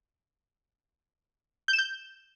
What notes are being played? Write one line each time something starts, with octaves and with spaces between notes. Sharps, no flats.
G6
E7
G6